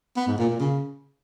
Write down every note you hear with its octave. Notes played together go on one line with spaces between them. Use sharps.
B3
G#2
A#2
A#2
C#3